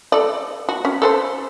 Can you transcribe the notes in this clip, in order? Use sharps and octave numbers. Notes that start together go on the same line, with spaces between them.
A4 D5
F#4
C#4
A4 A#4 C5